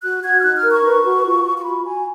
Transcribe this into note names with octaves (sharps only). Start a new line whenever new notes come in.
F#4 F#6
F#4 G#6
F6
D#4 F#6
F6
A#4
C#6
B4
F#4
F4
F4
C#6
F#4 B5
F#4 G#5